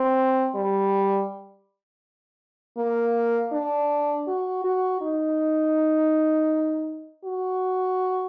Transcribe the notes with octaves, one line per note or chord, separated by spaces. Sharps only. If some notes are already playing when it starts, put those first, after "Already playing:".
Already playing: C4
G3
A#3
D4
F#4
F#4
D#4
F#4